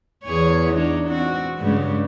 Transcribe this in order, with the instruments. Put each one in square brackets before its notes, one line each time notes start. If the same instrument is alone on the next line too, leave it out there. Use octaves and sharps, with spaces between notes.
[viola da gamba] E2 G#4 C#5
D4 D#4
C4 F#4
G2 C#3 G#3